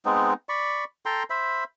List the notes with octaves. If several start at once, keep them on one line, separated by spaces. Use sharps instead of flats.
G#3 B3 C4 D#4
D5 B5 C#6
A4 G5 A#5 C6
C5 E5 B5